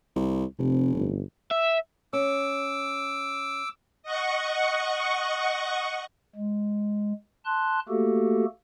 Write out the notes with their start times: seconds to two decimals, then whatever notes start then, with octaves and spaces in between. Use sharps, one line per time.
0.16 C2
0.59 F1 C3
0.95 G1
1.51 E5
2.13 C#4 D6 E6
4.03 D#5 F#5 C#6
6.35 G#3
7.45 A5 C6 F#6
7.89 A3 A#3 F#4 G4 A4